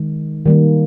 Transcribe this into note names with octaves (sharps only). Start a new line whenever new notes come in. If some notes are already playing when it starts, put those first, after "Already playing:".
Already playing: D#3 G#3
D#3 G3 A#3